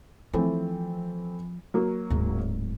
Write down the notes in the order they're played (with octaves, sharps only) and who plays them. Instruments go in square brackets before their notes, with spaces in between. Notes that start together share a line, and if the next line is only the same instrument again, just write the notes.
[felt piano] E3 A3 C4 [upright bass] F3
[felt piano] F#3 A#3
[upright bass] D1 G#2